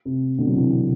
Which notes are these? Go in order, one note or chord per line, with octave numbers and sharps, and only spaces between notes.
C3
B2 D3
F#3
C3 E3
C3